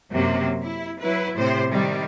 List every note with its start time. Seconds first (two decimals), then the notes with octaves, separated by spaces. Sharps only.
0.11 F#2 C3 F#3 A#3
0.62 E4
1.00 F#3 E4 B4
1.36 A2 C3 C5
1.70 C3 D#3 G3